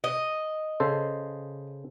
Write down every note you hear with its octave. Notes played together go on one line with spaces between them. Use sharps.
D#5
C#3 A4 C5